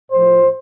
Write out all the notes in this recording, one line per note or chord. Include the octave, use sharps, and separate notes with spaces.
A2 F3 C5